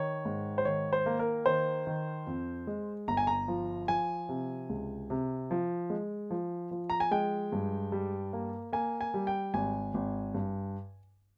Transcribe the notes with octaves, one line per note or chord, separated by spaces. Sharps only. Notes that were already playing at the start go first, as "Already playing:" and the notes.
Already playing: D#3 C#5
G#2
C5
D#3 C#5
C5
A#3
A#4
D#3 C5
D#3
F2
G#3
G1 A#5
G#5
A#5
F3
F3 G#5
C3
C#2
C3
F3
G#3
F3
F3
A#5
G#5
G#3 G5
G2
G3
A#3
A#3 G#5
G#5
G3
G5
G#1 G#5
G#1
G2